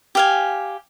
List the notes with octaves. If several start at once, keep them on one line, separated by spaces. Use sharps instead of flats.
G4 F5 G#5